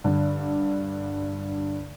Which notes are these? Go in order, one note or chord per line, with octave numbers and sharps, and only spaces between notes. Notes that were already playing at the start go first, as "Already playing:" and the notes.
G2 D3